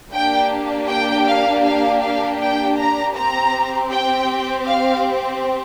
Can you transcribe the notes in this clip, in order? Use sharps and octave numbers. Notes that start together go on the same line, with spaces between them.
A#3 D4 G4 G5
G5
F5
F5
F5
G5
A#5
C4 G4 A#5
G5
F5